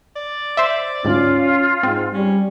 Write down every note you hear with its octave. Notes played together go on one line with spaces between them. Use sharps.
D5
C5 E5
D2 G#2 C#4 F4
G#2 C4
G3 C#4